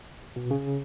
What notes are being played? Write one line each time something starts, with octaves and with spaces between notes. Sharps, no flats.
B2
C#3